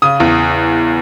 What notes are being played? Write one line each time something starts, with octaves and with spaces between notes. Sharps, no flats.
C#3 D#6
E2